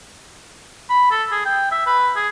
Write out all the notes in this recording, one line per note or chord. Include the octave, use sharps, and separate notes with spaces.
B5
A4
G#4
G5
E5
B4
G#4